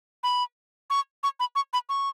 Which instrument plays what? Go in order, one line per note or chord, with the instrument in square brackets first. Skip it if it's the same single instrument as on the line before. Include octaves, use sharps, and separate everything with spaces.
[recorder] B5
C#6
C#6
B5
C#6
B5
C#6